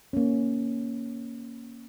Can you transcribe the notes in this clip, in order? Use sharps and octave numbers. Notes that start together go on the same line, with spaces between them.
A#3 C#4